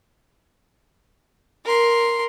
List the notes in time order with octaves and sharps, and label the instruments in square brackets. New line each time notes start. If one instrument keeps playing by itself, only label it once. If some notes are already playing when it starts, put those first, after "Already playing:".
[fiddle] A#4 C6